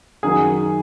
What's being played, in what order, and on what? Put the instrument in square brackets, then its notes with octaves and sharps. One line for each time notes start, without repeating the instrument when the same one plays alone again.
[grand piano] F#2 D#3 F#3 G#4